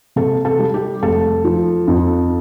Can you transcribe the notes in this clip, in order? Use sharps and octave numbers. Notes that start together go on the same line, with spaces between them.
C3 A4
A4
G3
G4
F1 A4
F3
F2